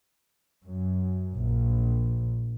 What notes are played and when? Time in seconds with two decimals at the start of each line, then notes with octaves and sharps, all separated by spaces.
0.66 F#2
1.36 A#1